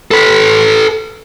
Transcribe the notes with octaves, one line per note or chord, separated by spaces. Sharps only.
A4 B4